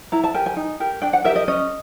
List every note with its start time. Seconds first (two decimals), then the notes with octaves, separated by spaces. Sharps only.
0.12 E4 A#5
0.24 A5
0.34 G4 A#4 G#5
0.46 G#5
0.56 D#4
0.80 G4 A#4
1.02 D4 G5
1.13 F#5
1.24 G4 A#4 E5
1.36 D#5
1.48 C#4 D#5